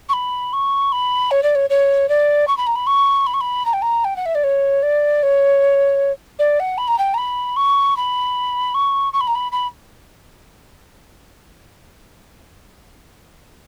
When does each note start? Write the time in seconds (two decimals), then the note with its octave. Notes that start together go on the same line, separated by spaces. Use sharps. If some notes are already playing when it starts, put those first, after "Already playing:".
0.09 C#6
0.13 B5
0.53 C#6
0.92 B5
1.31 C#5
1.43 D5
1.55 C#5
1.70 C#5
2.09 D5
2.48 C#6
2.57 B5
2.67 A#5
2.75 B5
2.87 C#6
3.27 B5
3.34 C#6
3.41 B5
3.66 A#5
3.73 G5
3.82 A#5
4.04 G5
4.16 F#5
4.26 E5
4.35 D5
4.44 C#5
4.83 D5
5.23 C#5
6.39 D5
6.60 F#5
6.78 B5
6.88 A#5
6.98 G5
7.14 A#5
7.18 B5
7.56 C#6
7.97 B5
8.74 C#6
9.13 C#6
9.21 B5
9.27 A#5
9.35 B5
9.52 B5